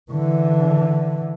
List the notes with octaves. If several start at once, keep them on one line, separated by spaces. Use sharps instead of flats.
D3 E3